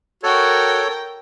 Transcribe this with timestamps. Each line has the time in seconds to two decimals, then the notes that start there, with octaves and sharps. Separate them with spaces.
0.23 F#4 A4 A#4 C#5 G5